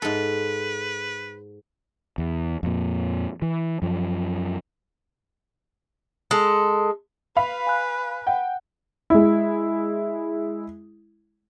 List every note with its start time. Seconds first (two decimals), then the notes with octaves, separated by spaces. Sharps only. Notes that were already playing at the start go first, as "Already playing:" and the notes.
0.02 G#2 A4 B4
2.18 E2
2.63 F2 A#2
3.42 E3
3.82 F#2 F3
6.31 G#3 A4
7.37 B4 F5 B5
7.67 G#5 F#6
8.27 F#5 G5
9.10 G#3 E4